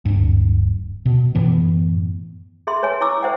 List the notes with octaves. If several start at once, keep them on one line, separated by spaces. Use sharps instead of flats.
D1 G2
B2
F#2 A2 E3 B3
G#4 E5 C6
B4 C#5 E5 G#5
E4 G#5 C#6 D6 E6
C5 E5 F#5 G5